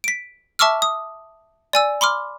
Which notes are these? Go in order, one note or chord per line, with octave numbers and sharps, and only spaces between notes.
B6 D7
E5 A5 C#6 D6 E6 F6
D#6
D5 G#5 E6
B5 C6 D6 F6